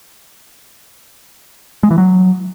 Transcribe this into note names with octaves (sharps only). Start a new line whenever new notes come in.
G#3
E3
F#3